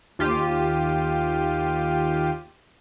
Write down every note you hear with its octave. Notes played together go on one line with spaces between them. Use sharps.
D#2 F4 G4 D#7